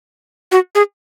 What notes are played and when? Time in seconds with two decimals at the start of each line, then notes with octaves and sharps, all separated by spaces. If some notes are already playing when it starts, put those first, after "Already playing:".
0.52 F#4
0.75 G#4